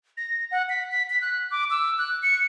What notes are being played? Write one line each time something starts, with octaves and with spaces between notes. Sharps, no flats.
A#6
F#5
B6
B6
B6
F#6
D6
E6
F#6
C#7